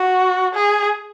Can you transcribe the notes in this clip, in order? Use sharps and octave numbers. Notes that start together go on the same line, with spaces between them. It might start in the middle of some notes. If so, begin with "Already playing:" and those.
Already playing: F#4
G#4